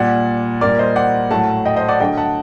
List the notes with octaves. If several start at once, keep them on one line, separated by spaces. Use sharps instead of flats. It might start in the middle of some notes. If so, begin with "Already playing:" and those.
Already playing: A#2 G3 D5 F#5
A#2 G3 A#4 D5
C5 D#5
D5 F#5
A2 F#3 A3 F#5 A5
D#5 G5
C5 D#5
D5 F#5
D3 F#3 A3 D#5 G5
F#5 A5